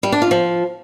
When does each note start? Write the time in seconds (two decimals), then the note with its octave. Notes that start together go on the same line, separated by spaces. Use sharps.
0.03 G3
0.12 D4
0.22 F4
0.31 F3